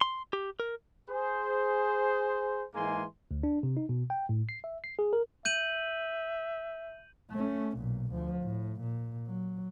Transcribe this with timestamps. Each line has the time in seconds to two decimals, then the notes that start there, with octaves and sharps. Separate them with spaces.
0.01 C6
0.33 G4
0.60 A#4
1.10 G#4 C5
2.74 G#2 E3 G#3 A#3 G#5 C6
3.31 D2
3.43 D4
3.63 C3
3.77 D#4
3.89 B2
4.10 G5
4.29 A2
4.49 C7
4.64 E5
4.84 C7
4.99 G#4
5.13 A#4
5.45 E5 G6 D#7 F#7
7.31 A3 C#4
7.78 B1 A#2
8.12 D2 F3
8.42 A2
8.81 A#2
9.27 F#3